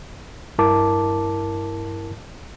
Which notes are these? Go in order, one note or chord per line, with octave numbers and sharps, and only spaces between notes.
G2 E4 A#4 A5 D6